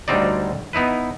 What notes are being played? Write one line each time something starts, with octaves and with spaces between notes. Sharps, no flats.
D2 F#3 G3 C4 D#4 D5
B3 D#4 E4 B4